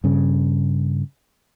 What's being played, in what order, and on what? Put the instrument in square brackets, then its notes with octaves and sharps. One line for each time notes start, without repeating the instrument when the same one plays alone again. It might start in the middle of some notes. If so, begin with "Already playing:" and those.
[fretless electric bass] G2 C#3